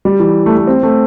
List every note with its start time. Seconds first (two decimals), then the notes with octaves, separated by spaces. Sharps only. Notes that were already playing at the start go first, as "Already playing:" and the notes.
0.05 G3
0.20 E3
0.46 A3
0.57 A3
0.67 C4
0.83 A3